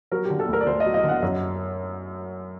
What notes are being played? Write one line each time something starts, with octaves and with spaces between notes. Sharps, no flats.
F#3 A#4
G4
D3
A4
D2 A#4
D5
D2 C5
D#5
F#3
D#5
D3 F#5
F#2